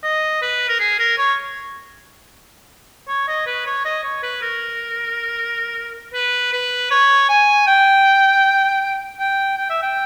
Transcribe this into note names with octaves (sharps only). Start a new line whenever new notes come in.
D#5
B4
A#4
G#4
A#4
C#5
C#5
D#5
B4
C#5
D#5
C#5
B4
A#4
B4
B4
C#5
G#5
G5
G5
G5
E5
G5